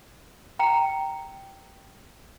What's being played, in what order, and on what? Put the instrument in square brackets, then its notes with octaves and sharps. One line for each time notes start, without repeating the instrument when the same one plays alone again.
[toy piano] G5 A#5